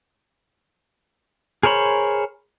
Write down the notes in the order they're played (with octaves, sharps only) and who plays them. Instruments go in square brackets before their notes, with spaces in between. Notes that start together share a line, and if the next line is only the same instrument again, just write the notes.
[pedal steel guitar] G#4 A#4 C5 C#5 B5